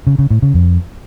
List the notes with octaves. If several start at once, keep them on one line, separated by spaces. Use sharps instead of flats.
C#3
C#3
A2
C#3
F2